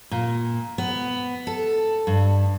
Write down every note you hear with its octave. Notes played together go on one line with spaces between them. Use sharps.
A#2
B3
A4
G2